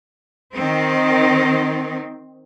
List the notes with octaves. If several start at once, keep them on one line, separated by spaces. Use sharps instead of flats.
D#3 C4